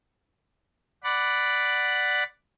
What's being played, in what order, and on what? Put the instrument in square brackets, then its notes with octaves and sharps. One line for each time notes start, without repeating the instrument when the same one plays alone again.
[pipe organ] D5 F#5 B5